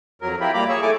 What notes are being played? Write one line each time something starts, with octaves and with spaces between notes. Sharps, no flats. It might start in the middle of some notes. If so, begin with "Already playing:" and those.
F2 F#3 A#4
E4 F4 G4 A#4 B5
A#2 G3 A#3 A#5 B5 D6
G#4 C#5 C#6 E6
A3 E4 A4 G#5 D6